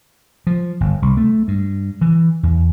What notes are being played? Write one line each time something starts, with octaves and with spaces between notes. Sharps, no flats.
F3
G1
C2
A3
G2
E3
E2